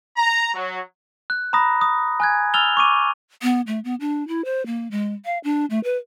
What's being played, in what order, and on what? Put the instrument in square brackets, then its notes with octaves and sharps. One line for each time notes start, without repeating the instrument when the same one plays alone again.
[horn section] A#5
F#3
[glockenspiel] F#6
A#5 B5 D#6 A#6
D#6
G#5 F#6 G#6
G#5 E6 F6 A6 F7 G7
C#6 D6 D#7
[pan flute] B3
A3
B3
D4
E4
C5
A#3
G#3
F5
D4
A3
B4